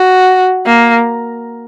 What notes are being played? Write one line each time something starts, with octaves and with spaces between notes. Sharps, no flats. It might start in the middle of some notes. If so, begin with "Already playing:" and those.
Already playing: F#4
A#3